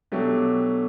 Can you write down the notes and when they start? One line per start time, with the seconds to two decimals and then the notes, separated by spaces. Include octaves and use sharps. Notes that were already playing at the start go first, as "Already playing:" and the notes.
0.12 B2 F#3 A3 D4 G4